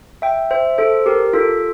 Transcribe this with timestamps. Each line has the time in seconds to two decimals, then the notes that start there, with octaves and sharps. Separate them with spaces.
0.22 E5 G5
0.51 C5 E5
0.78 A4 C5
1.06 G4 A#4
1.33 F4 A4